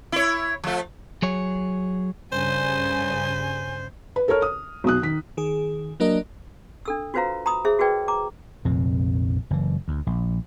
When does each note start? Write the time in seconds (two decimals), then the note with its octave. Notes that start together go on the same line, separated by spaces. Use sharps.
0.12 E4 C#5
0.64 F3 A3
1.22 F#3 G#4 C#5
2.32 G2 C#3 C5 G#5
4.16 B4
4.28 A4 A#4 C#5 F6
4.42 D#6
4.84 B1 B2 D#6 F#6
5.02 D#3 B6
5.37 D#3 G#4
6.00 F#3 A#3 D4 A#4 D#5
6.85 D4 A4 E6
7.14 F4 F#4 B4 C5 F5 A#5
7.46 A#5 B5 D#6
7.65 G#4 C5 E5
7.79 F#4 G#4 A#4 B4 D5 G5
8.08 A#5 D6
8.65 A#1 F2 C3 C4
9.50 F#1 E3
9.88 D2
10.07 A#1